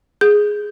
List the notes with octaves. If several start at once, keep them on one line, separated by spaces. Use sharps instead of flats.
G#4 G6